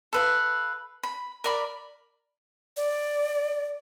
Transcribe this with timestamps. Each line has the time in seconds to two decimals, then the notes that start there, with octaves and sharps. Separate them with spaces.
0.13 A4 B4 F5
1.03 B5
1.44 A#4 D5 B5
2.77 D5